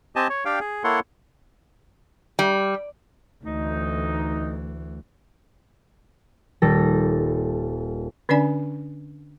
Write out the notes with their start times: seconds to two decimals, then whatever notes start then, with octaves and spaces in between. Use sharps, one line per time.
0.16 C4 G4 D#5 G#5 A5
0.30 C#5
0.45 D4 G4 F5 G5
0.60 G#4
0.84 A#3 E4 A4 C#5 F#5 C6
2.39 G3
3.44 D2 E3 A3 D#4
6.62 D#1 G3 A4 A#6
8.29 D3 C#4 D4 D5 G#5